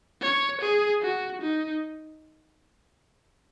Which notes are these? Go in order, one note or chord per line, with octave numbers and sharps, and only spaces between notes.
C#5
G#4
F#4
D#4